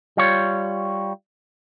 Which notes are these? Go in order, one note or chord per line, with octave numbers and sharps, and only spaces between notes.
G3 F4 C#5